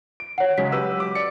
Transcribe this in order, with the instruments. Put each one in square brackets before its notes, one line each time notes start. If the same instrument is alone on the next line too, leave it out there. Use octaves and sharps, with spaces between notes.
[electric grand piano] D7
[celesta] C#5 F#5
[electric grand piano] C#3 F#3 G#3 [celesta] B6
[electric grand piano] G4 B4 E6
D6
D5 C#7